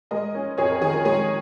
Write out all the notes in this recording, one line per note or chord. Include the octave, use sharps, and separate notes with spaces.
G#3 A#4 D#5
C#4
F2 G#4 C#5
A#4
D#3 G#4
A#4
G#3 G#4 C#5